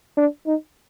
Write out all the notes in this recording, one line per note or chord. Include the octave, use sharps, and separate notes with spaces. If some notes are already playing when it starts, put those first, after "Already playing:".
D4
D#4